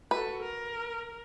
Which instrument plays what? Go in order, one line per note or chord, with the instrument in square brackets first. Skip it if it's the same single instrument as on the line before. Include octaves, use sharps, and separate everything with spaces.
[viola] F#4 A4 [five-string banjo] B4
[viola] A#4